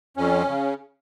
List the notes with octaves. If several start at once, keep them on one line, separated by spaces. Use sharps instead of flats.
F2 C#4
C#3